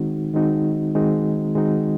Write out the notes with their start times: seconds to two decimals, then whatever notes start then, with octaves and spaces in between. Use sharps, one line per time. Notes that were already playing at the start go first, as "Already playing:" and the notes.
Already playing: D#3 G#3 C4 D#4 F#4
0.34 D#3 G#3 C4 D#4 F#4
0.95 D#3 G#3 C4 D#4 F#4
1.55 D#3 G#3 C4 D#4 F#4